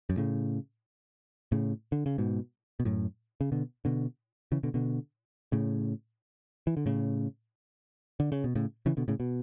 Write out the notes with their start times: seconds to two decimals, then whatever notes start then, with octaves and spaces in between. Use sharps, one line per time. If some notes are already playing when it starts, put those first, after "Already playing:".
0.10 F#2
0.17 A2 C#3
1.52 A2 C#3
1.92 D3
2.06 C#3
2.18 G#2 B2
2.80 B2
2.85 F#2 A2
3.41 C#3
3.52 B2 D3
3.85 B2 D3
4.52 C#3 E3
4.63 B2 D3
4.74 B2 D3
5.52 A2 C#3
6.67 E3
6.77 D3
6.86 A2 C#3
8.20 D3
8.32 C#3
8.44 B2
8.55 A2 C#3
8.86 C#3 E3
8.97 B2 D3
9.08 A2 C#3
9.20 B2